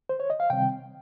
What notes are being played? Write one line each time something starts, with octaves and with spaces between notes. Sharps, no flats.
C5
C#5
D#5
F5
C3 D#3 G3 C4 G5